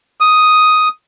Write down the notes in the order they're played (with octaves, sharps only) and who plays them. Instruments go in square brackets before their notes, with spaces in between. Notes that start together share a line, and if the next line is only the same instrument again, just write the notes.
[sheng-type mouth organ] D#6